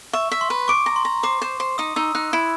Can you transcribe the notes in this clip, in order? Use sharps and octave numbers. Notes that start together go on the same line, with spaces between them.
E5 C#6
E5
C6
B4
C#6 D6
A#5
C6
A#5
C5 D6
C5
C5
D#4 D#6
D#4 E6
D#4 F#6
E4 G#6